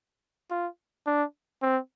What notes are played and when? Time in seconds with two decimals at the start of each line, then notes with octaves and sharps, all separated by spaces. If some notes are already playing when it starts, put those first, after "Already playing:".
0.51 F4
1.07 D4
1.62 C4